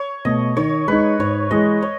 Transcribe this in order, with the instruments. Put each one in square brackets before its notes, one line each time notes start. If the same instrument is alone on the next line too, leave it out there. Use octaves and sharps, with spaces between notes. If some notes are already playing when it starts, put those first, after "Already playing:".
Already playing: [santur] C#5
[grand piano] B2 A3 [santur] D#5
[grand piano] D#3 [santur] C#5
[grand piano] G#3 D#4 [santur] B4
[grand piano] G#2 [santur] C#5
[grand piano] E3 G#3 [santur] D#5
[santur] C#5